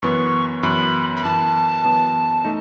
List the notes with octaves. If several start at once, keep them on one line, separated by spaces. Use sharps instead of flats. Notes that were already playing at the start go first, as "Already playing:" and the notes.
F#2 E3 B3 C#6
F#2 E3 B3 B5
B5
F#2 E3 B3 A5
F#2 E3 B3
A3 D#4